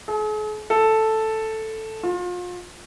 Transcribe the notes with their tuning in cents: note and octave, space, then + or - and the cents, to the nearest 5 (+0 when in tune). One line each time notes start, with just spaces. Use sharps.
G#4 +45
A4 +0
F4 +35